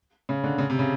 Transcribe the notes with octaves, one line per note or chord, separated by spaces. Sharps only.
C#3
D3
C#3
C3
C#3